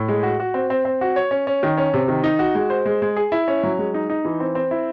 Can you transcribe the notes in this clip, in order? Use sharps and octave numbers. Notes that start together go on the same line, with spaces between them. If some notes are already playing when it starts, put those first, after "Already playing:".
Already playing: A2
G#3
F#4
F#4
C4
C4
C4
F#4
C#5
C#4
C#4
D#3
C#4
C3
D#3
D#4
F#4
G#3
C5
G#3
G#3
G#4
E4
C#4
F#3
G#3
D#4
D#4
E3
C4
C4
E4